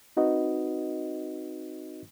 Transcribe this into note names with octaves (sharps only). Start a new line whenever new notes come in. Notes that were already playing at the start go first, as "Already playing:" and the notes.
C4 D#4 F#4 B4 D#5